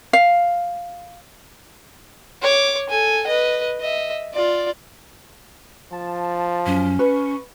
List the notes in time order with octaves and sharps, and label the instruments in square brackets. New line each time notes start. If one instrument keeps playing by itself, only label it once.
[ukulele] F5
[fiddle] C#5 D6
A4 G#5
B4 D#5
D#5 E5
F4 D5
[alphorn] F3 [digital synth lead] A5
[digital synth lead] F#2 [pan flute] C#4
[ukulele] B4 [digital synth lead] C#6